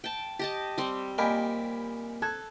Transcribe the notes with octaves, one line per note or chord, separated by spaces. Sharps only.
G5 A5
G4 D#5 A5
G3 C4
A#2 G4 A#4 D#5 G#5 B5
A4 A5 F#6 G#6